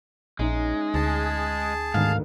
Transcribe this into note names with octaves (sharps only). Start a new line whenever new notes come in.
A#1 G#3 C#4 D#4 E5
D2 G#4 A5
D2 G#2 D#3 B3 F5